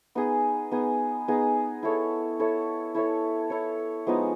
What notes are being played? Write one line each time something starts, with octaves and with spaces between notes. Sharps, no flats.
B3 D#4 G#4
B3 D#4 G#4
B3 D#4 G#4
E4 A4 C#5
E4 A4 C#5
E4 A4 C#5
E4 A4 C#5
F3 G#3 B3 D#4